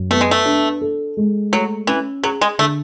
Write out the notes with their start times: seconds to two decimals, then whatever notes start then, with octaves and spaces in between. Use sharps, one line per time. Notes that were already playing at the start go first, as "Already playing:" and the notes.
Already playing: F#2
0.10 A3 B3
0.21 G#3
0.31 A3
0.46 D4
0.81 A4
1.17 G#3
1.52 F#3 A3
1.87 E3 C#4
2.23 F#3 G#4
2.41 G#3
2.59 D3 A3